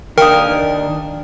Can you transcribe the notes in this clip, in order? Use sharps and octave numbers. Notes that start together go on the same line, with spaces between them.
D#3 D4 A#4 F5 G5 D#6